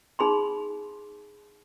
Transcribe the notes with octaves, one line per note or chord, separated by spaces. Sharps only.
D#4 G#4 B5 C6